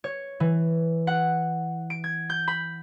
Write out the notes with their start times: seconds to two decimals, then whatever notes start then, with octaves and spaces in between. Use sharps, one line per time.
0.04 C#5
0.40 E3
1.07 F#5
1.90 D7
2.04 G#6
2.30 G6
2.47 B5